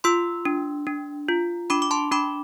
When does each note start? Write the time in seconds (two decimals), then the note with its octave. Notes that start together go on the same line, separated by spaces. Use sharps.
0.04 F4 C6 E6
0.45 D4
0.87 D4
1.29 F4
1.70 D4 B5 D6
1.82 D6
1.91 A5 C6
2.12 D4 B5 D6